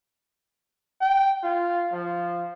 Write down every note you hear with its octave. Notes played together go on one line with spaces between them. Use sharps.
G5
F4
F3